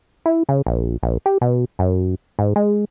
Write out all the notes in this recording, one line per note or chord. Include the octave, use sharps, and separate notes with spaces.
E4
C#3
A#1
A#1
G4
B2
F#2
G#2
G#3